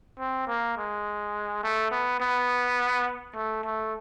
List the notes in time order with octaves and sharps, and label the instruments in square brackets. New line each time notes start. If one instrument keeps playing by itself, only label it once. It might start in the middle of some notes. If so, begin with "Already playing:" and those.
[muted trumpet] C4
A#3
G#3
A3
B3
B3
A3
A3